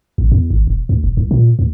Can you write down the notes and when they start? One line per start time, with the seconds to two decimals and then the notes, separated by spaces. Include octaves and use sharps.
0.18 A1
0.32 E2
0.50 G#1
0.67 E1
0.89 D2
1.04 D#1
1.17 C2
1.31 A#2
1.59 D2